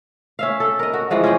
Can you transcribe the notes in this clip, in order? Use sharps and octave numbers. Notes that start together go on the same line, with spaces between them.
C#4 E5 F5
A4
A#4 D#5
F#4
E3 F3 G#3 F#4
C#4 G#4 D#5 G5